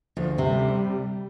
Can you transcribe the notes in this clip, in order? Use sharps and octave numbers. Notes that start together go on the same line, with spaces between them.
D2 F3
C3
G3